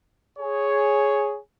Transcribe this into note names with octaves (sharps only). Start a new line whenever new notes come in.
G#4 C#5